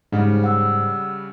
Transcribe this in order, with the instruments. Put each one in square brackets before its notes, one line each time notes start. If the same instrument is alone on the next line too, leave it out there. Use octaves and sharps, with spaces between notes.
[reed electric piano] G#2 [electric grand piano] C#3 G3
[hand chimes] F#5 E6